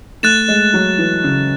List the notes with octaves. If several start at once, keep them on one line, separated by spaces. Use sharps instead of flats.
A3 F#6 A6 E7
G#3
F#3
E3
C#3